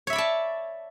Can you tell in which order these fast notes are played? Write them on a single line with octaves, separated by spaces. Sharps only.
C#5 E5 B5 D5 A5